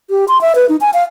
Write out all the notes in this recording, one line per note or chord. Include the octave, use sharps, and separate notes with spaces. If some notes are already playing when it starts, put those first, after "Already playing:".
G4
C6
E5
B4
D#4
G#5
F5